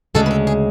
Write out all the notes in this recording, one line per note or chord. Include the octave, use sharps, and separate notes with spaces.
D2 C#3 G#3 A4
B4
A4
G#4